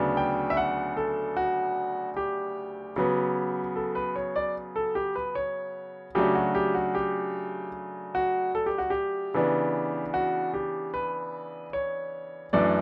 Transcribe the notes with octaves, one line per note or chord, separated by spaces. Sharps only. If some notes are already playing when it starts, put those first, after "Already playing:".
Already playing: D2 C#3 F#3 B3 D4
G5
E5
F#5
A4
F#4
G4
C#3 F#3 B3
A4
B4
C#5
D5
A4
G4
B4
C#5
C#3 F#3 A3 D4 G4
F#4
G4
F#4
G4
F#4
A4
G4
F#4
G4
C#3 E3 B3 D4
F#4
G4
B4
C#5
F#2 E3 A3 D4 D5